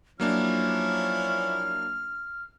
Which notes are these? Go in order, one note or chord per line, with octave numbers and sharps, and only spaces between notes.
F3 F#3 A#3 C#4 D4 E4 F6